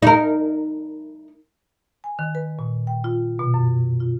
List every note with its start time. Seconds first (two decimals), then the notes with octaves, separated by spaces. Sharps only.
0.02 D#4 A#4
2.04 G#5
2.19 D#3
2.35 B4
2.59 A#2
2.87 G5
3.04 F4
3.39 B2
3.54 F#2
4.00 F4